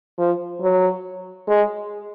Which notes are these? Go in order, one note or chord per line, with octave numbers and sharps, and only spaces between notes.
F3
F#3
G#3